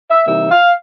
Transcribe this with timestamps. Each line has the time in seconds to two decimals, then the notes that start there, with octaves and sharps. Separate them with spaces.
0.10 E5
0.26 C3 E3 G3 A#3 D#4 E5
0.51 F5